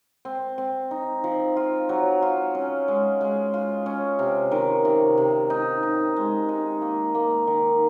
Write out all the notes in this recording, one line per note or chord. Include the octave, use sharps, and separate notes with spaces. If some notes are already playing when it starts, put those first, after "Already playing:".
C4
C4
D#4
F3
F4
F#3
F4
C#4
G#3
G#3
F4
C#4
C3
D#3
C3
C3
D#4
D#4
G#3
D#4
A#3
A#3
D#3